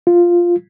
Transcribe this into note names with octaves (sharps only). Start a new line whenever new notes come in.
F4